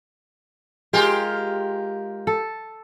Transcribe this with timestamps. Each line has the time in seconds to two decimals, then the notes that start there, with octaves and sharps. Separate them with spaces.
0.93 G#3 F4 G4 G#4 A#4 G5
2.27 A4